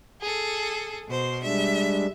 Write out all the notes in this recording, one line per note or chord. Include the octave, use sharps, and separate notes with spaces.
G#4 A4
B2 C5
G3 G#3 D4 E5